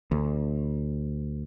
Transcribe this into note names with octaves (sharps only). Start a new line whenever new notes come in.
D2